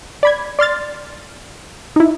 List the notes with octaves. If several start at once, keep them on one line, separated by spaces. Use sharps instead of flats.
D5 B5 G#6
D5 C6 F6 A6
D#4 E4